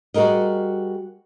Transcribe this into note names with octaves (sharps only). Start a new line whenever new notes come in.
G3 F#4 G#4 A#4 D#5